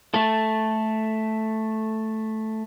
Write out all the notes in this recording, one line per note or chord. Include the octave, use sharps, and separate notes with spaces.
A3 A4